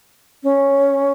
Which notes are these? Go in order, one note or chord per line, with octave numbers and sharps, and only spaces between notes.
C#4